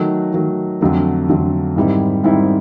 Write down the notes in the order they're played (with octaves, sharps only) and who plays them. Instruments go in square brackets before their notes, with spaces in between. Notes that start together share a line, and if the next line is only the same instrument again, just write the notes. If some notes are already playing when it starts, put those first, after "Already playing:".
Already playing: [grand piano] D#3 F#3 A3
D#3 F#3 A3
F2 D3 F#3 A3
F2 D3 F#3 A3
G#2 D#3 G3 C4 E4
G#2 D#3 G3 C4 E4